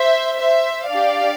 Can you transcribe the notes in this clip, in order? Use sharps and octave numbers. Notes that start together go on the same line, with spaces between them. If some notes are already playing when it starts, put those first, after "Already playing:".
Already playing: C5 E5
C5 E5
D4 G4 D5 F5